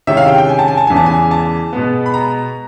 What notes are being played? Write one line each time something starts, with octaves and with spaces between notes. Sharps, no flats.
C3 D#3 G#3 C#4 E4 E5
F5
G5
G5
G#5
A5
G#5
A5
E2 C#3 E3 G#3 G#5
A5
G#5
A5
B2 G#3 B3
B5
A#5